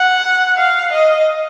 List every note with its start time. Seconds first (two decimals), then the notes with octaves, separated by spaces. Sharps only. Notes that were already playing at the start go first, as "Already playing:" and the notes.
Already playing: F#5
0.57 F5
0.92 D#5